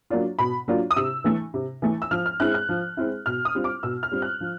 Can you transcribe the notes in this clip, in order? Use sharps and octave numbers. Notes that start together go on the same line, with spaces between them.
F#3 A#3 D4 F4
B2 B5
F#3 A#3 D4 F4
D#6
C3 E6
E3 A3
C3
E3 A3
E6
F3 F6
F6
G#3 C4 E4 F#6
F#6
F3
G#3 C4 E4
B2 F6
D#6
G3 C4 F4
D6
B2 E6
F6
G3 C4 F4
F#6
F3